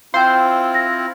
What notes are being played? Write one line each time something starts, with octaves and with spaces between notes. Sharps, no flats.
C4 E4 F4 C5 F5 G5
A#6